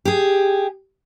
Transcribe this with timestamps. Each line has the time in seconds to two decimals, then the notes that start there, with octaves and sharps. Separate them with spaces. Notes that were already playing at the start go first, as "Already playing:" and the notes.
0.05 G4 G#4